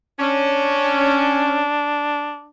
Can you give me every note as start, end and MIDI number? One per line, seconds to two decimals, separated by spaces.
0.20 1.62 61
0.20 2.50 62